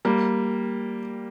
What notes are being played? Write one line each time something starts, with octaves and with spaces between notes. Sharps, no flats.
G3 A#3